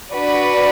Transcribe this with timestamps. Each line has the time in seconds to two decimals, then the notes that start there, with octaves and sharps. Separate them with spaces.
0.14 D4 F#4 B4 D5